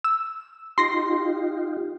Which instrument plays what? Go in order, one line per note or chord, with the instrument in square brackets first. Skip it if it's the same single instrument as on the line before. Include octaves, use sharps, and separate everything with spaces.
[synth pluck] E6
[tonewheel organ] D#4 F4 G4 [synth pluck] C6 A#6 C7